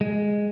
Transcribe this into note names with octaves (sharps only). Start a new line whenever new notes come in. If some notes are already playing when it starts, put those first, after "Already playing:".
G#3